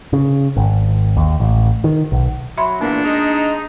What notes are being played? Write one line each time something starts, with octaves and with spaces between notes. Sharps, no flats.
C#3
G#1
D#2
A1
D#3
B1
F#3 E5 B5 C6
E2 A#2 A#3 B3 D4 F#5
G#3 D#4